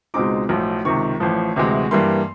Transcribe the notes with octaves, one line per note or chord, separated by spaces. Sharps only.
C#2 B2 G#3 C4 D#4 D6
B1 A2 F3
C#2 C3 D#3 C#6
A1 A2 F3
D2 C3 E3 G#3
G2 E3 G3 A#3 C6